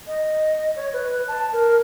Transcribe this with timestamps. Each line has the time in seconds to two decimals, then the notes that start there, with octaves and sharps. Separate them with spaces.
0.07 D#5
0.76 C#5
0.93 B4
1.28 A5
1.52 A#4